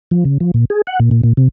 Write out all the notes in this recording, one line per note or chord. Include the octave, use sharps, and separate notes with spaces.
F3
C#3
F3
A#2
G#4
F#5
A#2
A#2
A#2
C3